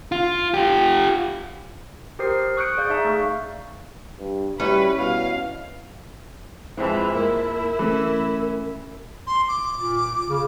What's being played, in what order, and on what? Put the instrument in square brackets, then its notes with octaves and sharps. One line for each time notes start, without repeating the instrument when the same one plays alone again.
[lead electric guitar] F4
F4 G4
[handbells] G4 A#4 C5 D#6 C7
C#6 D#6 F#6 G6 C#7 D7
G#4 D5 F5 G6
D#4 E5 F5 A5
A3 G#4 C#6 F6
[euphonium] G2
[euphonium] G3 [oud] C#4 E4 F#4 [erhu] B4
[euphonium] B2 [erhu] F5
[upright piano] F2 G#3 [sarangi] E3 [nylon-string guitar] E4 [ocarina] C5
[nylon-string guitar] A#3 [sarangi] E4 [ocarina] A#4
[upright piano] E3 [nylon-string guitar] A3 C#4
[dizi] C6
D6
[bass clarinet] A#2
C#3